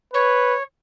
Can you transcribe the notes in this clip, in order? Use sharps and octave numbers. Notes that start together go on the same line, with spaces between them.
B4 C#5